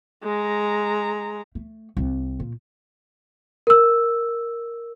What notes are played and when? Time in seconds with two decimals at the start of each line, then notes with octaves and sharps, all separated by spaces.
0.24 G#3 A#5
1.55 A3
1.97 C2 C4
2.40 A#2
3.67 A#4 E6